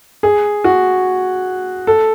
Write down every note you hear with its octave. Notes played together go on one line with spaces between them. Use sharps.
G#4
F#4
A4